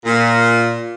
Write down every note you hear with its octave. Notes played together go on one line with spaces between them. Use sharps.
A#2